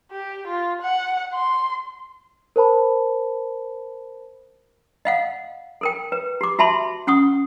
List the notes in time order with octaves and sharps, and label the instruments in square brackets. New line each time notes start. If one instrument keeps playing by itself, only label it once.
[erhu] G4
F4
F#5
C6
[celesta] A#4 C5 A5 B5
[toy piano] D#5 F5 F#5
A4 A#4 G5
B4
G4 D6
F#4 E5 A5 B5 C6
C#4 F#5 C#6 D#6